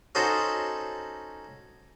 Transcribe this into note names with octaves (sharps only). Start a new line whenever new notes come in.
C#4 D#4 F#4 A4 C5